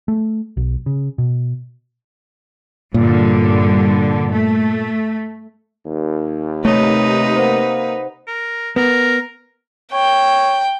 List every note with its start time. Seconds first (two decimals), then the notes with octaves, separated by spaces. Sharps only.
0.08 A3
0.57 B1
0.86 C#3
1.18 B2
2.94 G2 A#2 D3
4.31 A3
5.85 D#2
6.65 C3 A3 D#4 B4 C#5
7.36 A#3 C5 F#5
8.27 A#4
8.76 B3 A#4
9.93 C#5 G5